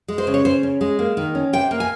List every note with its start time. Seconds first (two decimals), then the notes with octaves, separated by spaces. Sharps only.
0.08 G#3
0.18 C5
0.27 C#3
0.34 C#5
0.45 C#3 C5
0.63 C#4
0.81 G#3
0.99 A#3
1.17 D#3
1.35 C#4
1.53 C3 G5
1.71 A#3
1.80 G#5